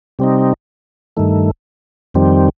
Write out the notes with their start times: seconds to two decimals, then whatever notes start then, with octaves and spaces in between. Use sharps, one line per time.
0.19 C3 G3 C4 D#4
1.17 G2 D#3 A3
2.14 F2 D#3 G3 C4